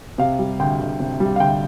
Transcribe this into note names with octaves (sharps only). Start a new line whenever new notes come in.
C3 F5
G3
D2 G5
D2
C3
G3
F5
D2 G5